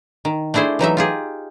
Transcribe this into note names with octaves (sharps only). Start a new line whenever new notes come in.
D#3
A3 D4 E4 G#4 C5
E3 F#3 D#4 E5
F4 G4 G#4